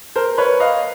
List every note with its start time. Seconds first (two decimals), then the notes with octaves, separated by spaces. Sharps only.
0.16 A#4 C5
0.38 B4 C#5
0.60 D#5 F5